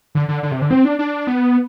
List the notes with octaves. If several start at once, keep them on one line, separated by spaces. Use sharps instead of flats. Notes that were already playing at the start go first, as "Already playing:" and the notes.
D3
D3
D3
C3
D3
C4
D4
D4
B3